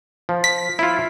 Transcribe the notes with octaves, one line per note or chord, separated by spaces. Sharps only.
F3
B6
E4 F4